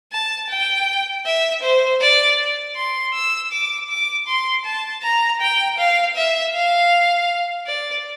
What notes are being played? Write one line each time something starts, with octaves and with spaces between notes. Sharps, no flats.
A5
G5
E5
C5
D5
C6
E6
D6
D6
C6
A5
A#5
G5
F5
E5
F5
D5